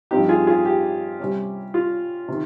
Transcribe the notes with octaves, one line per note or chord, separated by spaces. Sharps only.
G2 F3 C4 D#4 G4
F4 G#4
F4 G#4
G4
C3 G3 C#4
F4
C3 D#3